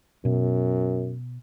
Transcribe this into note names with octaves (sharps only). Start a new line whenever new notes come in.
F#2 B2